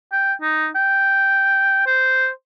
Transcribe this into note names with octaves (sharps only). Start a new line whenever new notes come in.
G5
D#4
G5
C5